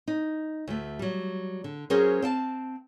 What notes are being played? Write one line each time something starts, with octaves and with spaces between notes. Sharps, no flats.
D#4
D2 A3
F#3 G3
D3
F#3 C#4 G#4 A#4 C5
C4 F5 A5